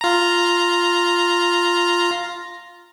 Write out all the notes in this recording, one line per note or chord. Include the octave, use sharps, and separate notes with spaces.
F4 A#5